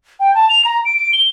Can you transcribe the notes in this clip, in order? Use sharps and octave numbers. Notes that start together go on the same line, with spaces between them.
G5
A5
F7
A#5
D7
G7